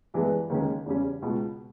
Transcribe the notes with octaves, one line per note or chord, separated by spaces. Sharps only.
G2 E3 G#3 B3
D#2 D#3 G#3 C#4
E2 C#3 G3 C#4
C#2 B2 G#3